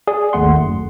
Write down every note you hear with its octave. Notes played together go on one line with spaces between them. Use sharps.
G#4 D5
G#1 D#2 A3 F#5 C6
F#2